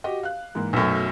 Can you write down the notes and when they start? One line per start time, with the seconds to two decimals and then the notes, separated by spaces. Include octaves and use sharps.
0.04 F#4 G4 D#5
0.23 F5 F#6
0.55 G#2 E3 A#3
0.73 B1 F#2 F#3 A3